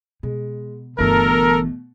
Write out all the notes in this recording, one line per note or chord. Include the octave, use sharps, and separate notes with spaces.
B2 G#3
G1 B2 E3 A3 A4 A#4